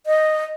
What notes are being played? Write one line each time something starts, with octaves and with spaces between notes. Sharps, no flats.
D#5